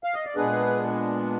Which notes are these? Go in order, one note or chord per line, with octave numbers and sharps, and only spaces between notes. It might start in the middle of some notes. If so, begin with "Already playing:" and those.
F5
D#5
D5
A#2 G#3 B3 D4 G#4 B4